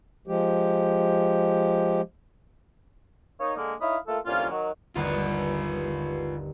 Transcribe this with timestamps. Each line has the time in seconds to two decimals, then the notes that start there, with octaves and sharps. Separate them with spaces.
0.27 F3 G#3 G4
3.40 A#3 D#4 C#5
3.57 D3 G#3 A#3
3.81 D#4 E4 C#5 F5 B5 D#6
4.07 A3 A#3 F4 A4
4.26 C2 D3 A#3 C#4 F4
4.50 D#3 F#3
4.96 G1 D#2 F4 B4 F#5